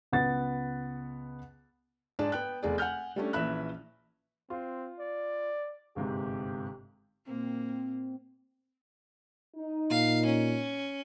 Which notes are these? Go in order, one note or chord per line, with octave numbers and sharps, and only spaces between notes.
C#2 B3 F#5 A6
G#2 D4 G#4 D5 A5
B3 G5 F#6
F1 E2 G#4 D5
F#5 G#5 F6 G6
G3 A3 C#4 D4
A#1 E3 C#4 E5 B5 F#6
C4 F4
D5
G1 G#2 C3 G4
A#2 A#3 C4
D#4
A#2 F5
C#4